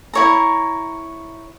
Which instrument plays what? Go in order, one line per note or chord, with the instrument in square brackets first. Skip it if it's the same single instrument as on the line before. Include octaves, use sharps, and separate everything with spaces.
[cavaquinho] E4 C#5 A#5